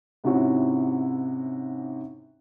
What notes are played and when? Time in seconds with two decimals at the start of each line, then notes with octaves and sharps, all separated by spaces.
0.24 G#2 C3 C4 C#4 E4 F#4